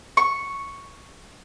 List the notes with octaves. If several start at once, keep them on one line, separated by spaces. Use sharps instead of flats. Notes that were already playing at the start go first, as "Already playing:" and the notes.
C#6